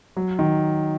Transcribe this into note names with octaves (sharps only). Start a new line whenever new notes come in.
F#3
D#3